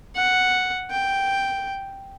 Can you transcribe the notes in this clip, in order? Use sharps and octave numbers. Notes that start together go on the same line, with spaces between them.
F#5
G5